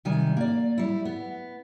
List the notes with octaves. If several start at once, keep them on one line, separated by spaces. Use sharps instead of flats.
C3 D#3 G3 G#5
A#3 D5
G3 E4
B3